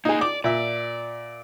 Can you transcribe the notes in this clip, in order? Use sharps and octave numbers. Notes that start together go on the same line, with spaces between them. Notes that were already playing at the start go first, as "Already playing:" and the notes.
A#3 D#4 G#4 D#5
D5 D6
A#2 D5 E5